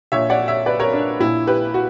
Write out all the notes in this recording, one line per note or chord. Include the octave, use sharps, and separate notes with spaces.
A#1 A#2 C#5 E5
D5 F#5
C#5 E5
B4 D5
A#4 C#5
D4
A#1 A#2 E4
G4 B4
F#4